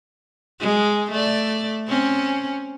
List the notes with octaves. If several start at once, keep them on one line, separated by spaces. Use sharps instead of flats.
G#3
A3 D5
C4 C#4